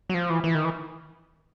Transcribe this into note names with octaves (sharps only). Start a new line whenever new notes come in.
F#3
F3
E3
E3
D#3
E3